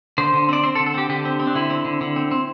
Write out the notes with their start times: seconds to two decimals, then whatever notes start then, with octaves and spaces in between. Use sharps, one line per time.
0.18 D3 C5
0.33 D3
0.49 C4 D5
0.63 C4 C5
0.75 A4
0.79 D3
0.86 A4
0.94 C4 G4
1.09 D3 G4
1.25 C4
1.40 C4
1.47 D4
1.55 D3 E4
1.70 C4
1.85 D3
2.01 D3
2.16 C4
2.31 C4